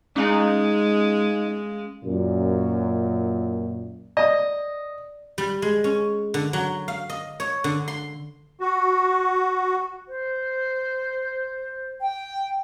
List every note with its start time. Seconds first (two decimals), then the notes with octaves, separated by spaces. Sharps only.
0.16 G#3 C#4 D#4 F5 G#5
2.05 F#2 A#2
4.17 D5 D#5
5.38 G3
5.62 G#3
5.84 C#4
6.34 D3
6.53 F#3
6.88 F5
7.10 D#5
7.40 C#5
7.64 D3
7.88 C6
8.60 F#4
10.06 C5
12.00 G5